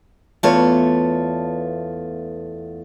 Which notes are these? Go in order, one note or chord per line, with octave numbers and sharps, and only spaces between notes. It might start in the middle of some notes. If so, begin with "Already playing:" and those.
E2 A3 B3 F4 A4 C#5